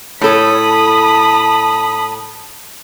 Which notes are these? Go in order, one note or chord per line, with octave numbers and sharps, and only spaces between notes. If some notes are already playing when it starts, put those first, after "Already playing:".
A2 A4 C#5 B5 D#6
A5